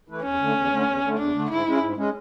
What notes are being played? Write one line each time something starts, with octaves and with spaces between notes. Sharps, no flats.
E3 A3 E4 B4
E2 C#4
D3 A3
E2
D3 A3
E2
D3 A3
E2 D4
D3 A3
G#2 E4
G#3 C#4
G#2
G#3 C#4